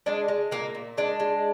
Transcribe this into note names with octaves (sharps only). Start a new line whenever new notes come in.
G#3 D4
G#3
A#2 A#3
A#2
G#3 D4
G#3